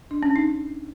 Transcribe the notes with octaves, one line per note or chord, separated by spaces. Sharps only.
D4
C#4
D#4